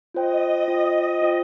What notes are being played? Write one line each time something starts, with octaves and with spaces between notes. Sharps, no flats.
F4 C5 D#5 G5
F4 C5 G5
F4 C5 G5